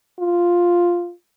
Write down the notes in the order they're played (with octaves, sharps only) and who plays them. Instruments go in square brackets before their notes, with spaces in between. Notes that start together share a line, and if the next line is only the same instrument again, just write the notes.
[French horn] F4